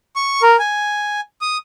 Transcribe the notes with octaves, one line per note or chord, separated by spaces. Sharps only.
C#6
A#4
G#5
D#6